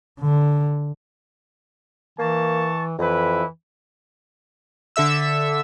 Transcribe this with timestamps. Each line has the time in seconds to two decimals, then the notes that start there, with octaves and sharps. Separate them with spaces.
0.20 D3
2.19 E3 A#3 A5 C#6
2.98 F2 E3 E4 B4
4.96 D3 A4 E5 E6